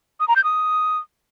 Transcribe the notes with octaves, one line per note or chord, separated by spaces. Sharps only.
D#6
A#5
G6
D#6